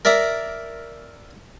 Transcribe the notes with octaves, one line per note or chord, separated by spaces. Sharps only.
A#4 D5 E5 A#5